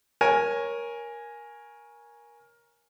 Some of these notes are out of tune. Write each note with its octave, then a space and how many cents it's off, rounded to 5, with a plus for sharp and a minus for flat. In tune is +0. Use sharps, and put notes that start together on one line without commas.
A#4 +15 C#5 -5 G#5 +0